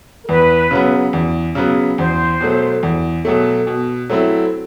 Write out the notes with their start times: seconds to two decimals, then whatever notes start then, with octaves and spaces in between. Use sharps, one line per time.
0.25 A#4
0.28 E2 B4
0.71 C#3 F#3 B3
1.13 E2
1.55 C#3 F#3 B3
1.97 E2 C5
2.40 B2 F#3 A3
2.83 E2
3.25 B2 F#3 A3
3.67 B2
4.09 F#3 A3 C4 E4